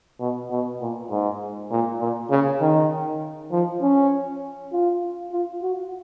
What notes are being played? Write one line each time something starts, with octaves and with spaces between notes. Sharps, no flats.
B2
B2
A#2
G#2
A#2
A#2
C#3
D#3
F3
C#4
F4
F4
F#4